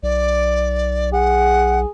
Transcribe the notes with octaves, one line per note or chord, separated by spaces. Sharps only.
B1 D5
G#4 F#5